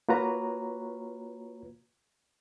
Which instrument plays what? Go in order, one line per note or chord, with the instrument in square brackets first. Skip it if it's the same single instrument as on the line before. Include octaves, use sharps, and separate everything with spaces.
[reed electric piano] A#3 F4 F#4 B4 C#5 A#5